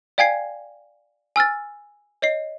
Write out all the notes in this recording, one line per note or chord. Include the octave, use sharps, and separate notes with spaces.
D5 F5 G5 G#5 G#6 C7
G#5 E6 F6 A6
C#5 D#5 C7